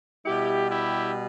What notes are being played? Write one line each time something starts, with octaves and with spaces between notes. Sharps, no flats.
B2 G3 E4 G4
E4 G4